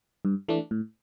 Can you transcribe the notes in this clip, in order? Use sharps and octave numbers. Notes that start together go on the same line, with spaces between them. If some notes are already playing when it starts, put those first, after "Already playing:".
G2
E3 A3 D4
A2